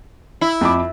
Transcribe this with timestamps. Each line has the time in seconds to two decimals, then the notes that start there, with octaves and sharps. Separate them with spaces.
0.41 E4
0.61 F2 B5 D6